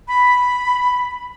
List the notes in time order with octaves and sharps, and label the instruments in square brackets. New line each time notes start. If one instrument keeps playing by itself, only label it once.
[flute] B5